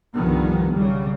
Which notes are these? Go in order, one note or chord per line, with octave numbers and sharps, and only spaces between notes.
C2 G2 D3 D#3 F3 B3
C#3 F#3 G3